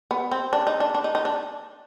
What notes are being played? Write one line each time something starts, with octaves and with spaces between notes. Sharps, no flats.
B3
C4
D4
D#4
D4
D4
D#4
D#4
D4